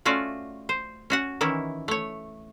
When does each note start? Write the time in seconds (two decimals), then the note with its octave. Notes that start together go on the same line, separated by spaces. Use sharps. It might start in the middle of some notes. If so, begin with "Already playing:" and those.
0.05 A3 C#4 F4 F#4 D5
0.69 C5
1.10 C#4 F#4 F#5
1.41 D#3 E3 C#4 E4
1.88 A3 C#5